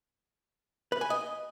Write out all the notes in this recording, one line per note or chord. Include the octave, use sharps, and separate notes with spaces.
B4
G#5
D#5